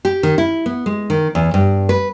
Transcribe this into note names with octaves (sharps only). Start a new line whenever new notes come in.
G4
D#3
E4
B3
G#3
D#3
E2
G2
B4